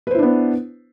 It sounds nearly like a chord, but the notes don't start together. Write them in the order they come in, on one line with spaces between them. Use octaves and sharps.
B4 C5 E4 D4 B3